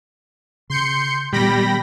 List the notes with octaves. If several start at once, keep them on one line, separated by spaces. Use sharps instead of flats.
C#3 C6 G6 C#7
A#2 D#3 G3 B3 G5 B5 A#6